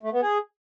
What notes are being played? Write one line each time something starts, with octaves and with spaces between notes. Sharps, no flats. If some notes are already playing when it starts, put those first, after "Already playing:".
A3
B3
G#4